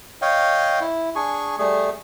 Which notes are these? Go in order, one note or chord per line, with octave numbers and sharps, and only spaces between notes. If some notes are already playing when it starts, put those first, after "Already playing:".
C#5 D#5 F5 G5
E4
D4 G#4 G#5 C#6
G3 A3 G#4